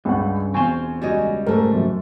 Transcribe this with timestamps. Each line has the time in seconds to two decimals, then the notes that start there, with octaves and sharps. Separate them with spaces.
0.05 C#2 G2 C#3 C#4 F#5
0.54 E1 C4 F4 C5 G#5 C#6
1.02 C#2 G3 F#4 C#5 D#5
1.46 G#2 A3 A4 A#4
1.73 F#2